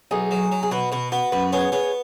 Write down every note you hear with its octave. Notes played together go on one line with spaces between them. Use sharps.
B1 D#4 G#4
F#3
F#3
G#4
B2 F#4 B4
B2 F#4 B4
B3 F#4 B4
F#2 F#4 B4
B3 G#4 C#5
B3 G#4 C#5